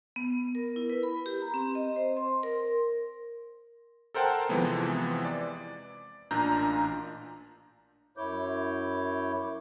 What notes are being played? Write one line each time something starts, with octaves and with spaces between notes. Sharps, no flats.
B3
A#4
E4
B4
B5
G4
A#5
C4
D#5
C5
C6
A#4
A4 A#4 C5 F#5 G5 A5
E2 C3 E3 F3 G#3 B3
D5
A1 A#2 D4 F4 A#5 G6
F#2 E4 C#5 D6 G6